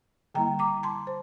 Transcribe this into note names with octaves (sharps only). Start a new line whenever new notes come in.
D3 G3 A#3 E4 G5 A#5
A#5 D6
A5 C6
C5